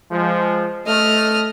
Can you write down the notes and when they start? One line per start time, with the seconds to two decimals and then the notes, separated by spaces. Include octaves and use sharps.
0.11 F3 G#3
0.87 A3 D#5 F6